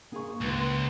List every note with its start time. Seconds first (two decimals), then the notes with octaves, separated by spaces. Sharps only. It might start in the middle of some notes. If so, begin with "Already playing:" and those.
0.12 A#3 G#4 C#6
0.41 C#2 B4 C5